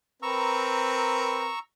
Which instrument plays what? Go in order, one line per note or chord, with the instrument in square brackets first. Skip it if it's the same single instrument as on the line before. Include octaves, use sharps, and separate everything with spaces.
[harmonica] C4 A#4 B4 [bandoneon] A#5 C#6 E6